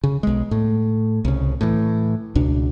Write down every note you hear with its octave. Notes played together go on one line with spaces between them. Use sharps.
C#3
B1 G#3
A2
C2 C#3
A2 E3
C#2 B2 D4